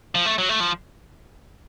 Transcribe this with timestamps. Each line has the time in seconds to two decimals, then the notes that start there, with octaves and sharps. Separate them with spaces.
0.15 F3
0.26 A3
0.38 F#3
0.49 A3
0.60 F3